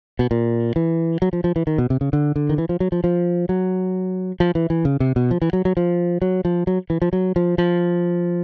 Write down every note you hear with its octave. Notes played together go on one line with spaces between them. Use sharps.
B2
A#2
E3
F#3
F3
F3
E3
D#3
B2
C3
C#3
D3
D3
D#3
E3
F3
F#3
F3
F3
F#3
F3
E3
E3
C#3
C3
B2
F3
E3
F#3
F#3
F3
F#3
F3
F#3
E3
F3
F#3
F3
F3